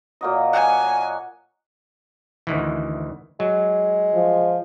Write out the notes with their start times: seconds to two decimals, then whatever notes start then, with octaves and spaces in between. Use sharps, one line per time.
0.21 A#2 F#3 D#5
0.53 F#5 G#5
2.47 D2 D#3 E3
3.40 F#3 G#3
4.15 F3